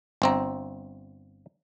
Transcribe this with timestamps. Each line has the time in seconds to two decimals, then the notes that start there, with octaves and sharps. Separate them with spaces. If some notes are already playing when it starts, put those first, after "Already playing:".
0.22 G1 C4 A#5